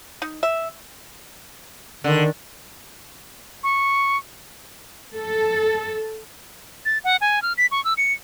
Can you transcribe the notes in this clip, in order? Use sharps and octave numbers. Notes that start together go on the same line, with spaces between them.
D#4
E5
D3 D#3
C#6
A4
A6
F#5
G#5
F6
B6
C#6
E6
C#7